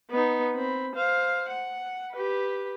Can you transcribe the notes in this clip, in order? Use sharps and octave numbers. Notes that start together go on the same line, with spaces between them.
B3 D#4
C4 B5
C5 F5
F#5
G4 B4